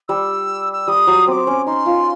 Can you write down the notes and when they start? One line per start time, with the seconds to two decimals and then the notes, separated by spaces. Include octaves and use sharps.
0.08 G3 E6
0.73 E6
0.88 G3 D#6
1.07 F#3
1.26 C4 D6 D#6
1.47 C#4
1.66 D#4 C6
1.86 F4